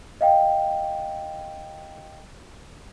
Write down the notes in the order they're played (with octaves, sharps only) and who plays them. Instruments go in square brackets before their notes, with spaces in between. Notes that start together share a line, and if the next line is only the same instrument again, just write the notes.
[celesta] D#5 F5 G5